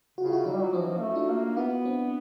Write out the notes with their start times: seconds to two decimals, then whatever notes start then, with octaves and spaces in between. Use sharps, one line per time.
0.18 C#3 F#4
0.26 F4
0.32 E4 F#4
0.46 F#3 D#4 F4
0.54 G3
0.62 F#3
0.73 F3 C#4 D#4
0.81 E3
0.88 F3
0.98 A#3
1.02 A3
1.15 D4 E4
1.30 A#3
1.57 B3 E4 F#4
1.85 C4 D4